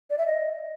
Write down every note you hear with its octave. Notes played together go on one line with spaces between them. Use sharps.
D5
E5
D#5